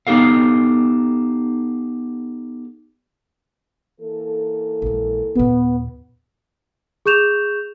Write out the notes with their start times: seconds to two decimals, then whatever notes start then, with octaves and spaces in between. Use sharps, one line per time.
0.07 B3 D#4 G4 A4 F5
4.01 E3 A#3 A4
4.82 A#1 G#3
5.35 D#2 A#2 B3
7.06 G#4 C#6 G6 E7 F7